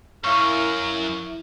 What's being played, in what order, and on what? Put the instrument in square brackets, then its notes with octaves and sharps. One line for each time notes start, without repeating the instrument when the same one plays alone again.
[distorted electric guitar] F#2 [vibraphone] E4 E5 [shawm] A#4 [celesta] F5 C#6